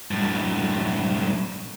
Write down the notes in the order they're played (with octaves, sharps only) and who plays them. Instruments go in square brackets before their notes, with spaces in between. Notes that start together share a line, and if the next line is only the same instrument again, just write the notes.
[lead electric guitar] F#2 A2